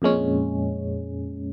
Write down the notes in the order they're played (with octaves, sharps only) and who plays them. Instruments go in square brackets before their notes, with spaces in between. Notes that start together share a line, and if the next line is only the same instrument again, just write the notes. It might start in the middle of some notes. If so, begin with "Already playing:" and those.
[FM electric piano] F2 A#2 G#3 C#4